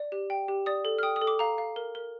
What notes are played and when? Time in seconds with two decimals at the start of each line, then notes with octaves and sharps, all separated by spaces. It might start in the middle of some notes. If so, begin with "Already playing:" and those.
Already playing: D5
0.12 G4
0.30 G5
0.48 G4
0.66 D5 D#6
0.85 A4
0.98 F6
1.03 G5 D#6
1.16 D#6
1.21 A4
1.27 D6
1.39 F5 A#5
1.58 F5
1.76 A#4
1.95 A#4